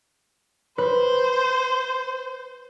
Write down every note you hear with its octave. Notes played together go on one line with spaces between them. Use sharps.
B4 C5